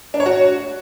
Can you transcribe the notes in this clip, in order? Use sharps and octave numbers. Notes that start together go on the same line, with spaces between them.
D4
C#5
F#4